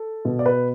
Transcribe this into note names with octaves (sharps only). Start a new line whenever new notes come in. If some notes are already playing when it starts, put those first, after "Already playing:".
Already playing: A4
B2
D5
B4